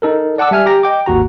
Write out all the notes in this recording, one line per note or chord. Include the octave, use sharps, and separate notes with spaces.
D#4 A4 A#4
D5 F#5 A5 D6 E6
G3 E5 G#5 F6
G4 G5 A#5 A#6
D#5 G5 D6
G#1 D#2 F#4 A#5